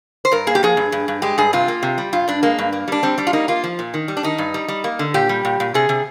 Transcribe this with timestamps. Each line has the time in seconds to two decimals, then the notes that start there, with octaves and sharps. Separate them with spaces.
0.25 C5
0.32 G2 A#4
0.47 A#3 G#4
0.55 G4
0.63 F3 G#4
0.77 G2
0.92 G2
1.08 G2
1.22 G#3 G4
1.38 G2 G#4
1.53 C3 F4
1.68 A#3
1.83 C3
1.98 G3
2.13 G2 F4
2.28 G2 D4
2.43 G#3 A#3
2.59 G2
2.73 A#3
2.88 G3 D4
3.03 G3 C4
3.18 G3 D4
3.27 F4
3.33 A#3 D#4
3.48 A#3 F4
3.64 F3
3.79 A#2
3.94 D#3
4.08 G3
4.17 D4
4.23 D#3 D#4
4.38 G2
4.54 G3
4.68 G3
4.84 A#3
4.99 D3
5.14 A#2 G4
5.29 G3
5.45 A#2
5.60 A#2
5.74 C3 G#4
5.89 C3